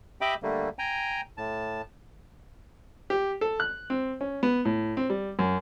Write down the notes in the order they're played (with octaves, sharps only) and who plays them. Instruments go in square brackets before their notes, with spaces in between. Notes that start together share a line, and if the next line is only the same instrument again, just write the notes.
[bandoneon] G4 D#5 E5 G5 B5 D6
D3 G3 A3 A#3
G5 G#5 A#5
A2 A5
[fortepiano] G4
A4
F#6
C4
C#4
B3
A2
C4
G3
F#2